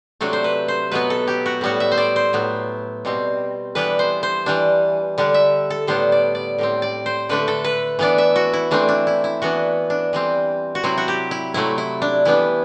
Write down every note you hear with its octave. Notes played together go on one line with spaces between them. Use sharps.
C3 F#3 A3 D4 A4
C5
B4
C5
B2 F#3 B3 B4
A4
G4
F#4
A2 G3 B3 F#4
E5
C5
D5
C5
A2 F#3 B3
B2 G3 C4
E3 G3 B3 D4 B4
C5
C5
E3 G3 D4
D3 G3 D4
E5
A4
A2 G3 B3 D4 C5
D5
D5
A2 G3 C4
D5
C5
D3 A3 D4 B4
A4
B4
E3 B3 D4 D5
E5
F#4
E4
E3 A3 C4 D4
D4
E4
E4
E3 B3 D4 F#4
D4
E3 G3 C4
F#4
C3 F#3 C4 E4
F#4
G4
E4
C3 F#3 A3 E4
E4
D4
E3 G3 B3 D4 E4